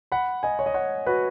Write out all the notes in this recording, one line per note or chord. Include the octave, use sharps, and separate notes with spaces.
F#5 B5
D#5 G#5
C#5
D#5
C#5 F#5
F#4 B4